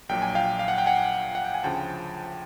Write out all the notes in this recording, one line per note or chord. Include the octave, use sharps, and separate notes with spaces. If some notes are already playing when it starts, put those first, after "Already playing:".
A#1 A#2 F#3 G5
G#5
F5 G5
F5
F#5
G5
F#5 G#5
F#5
G5
G#5
D2 C#3 F3 G5 A5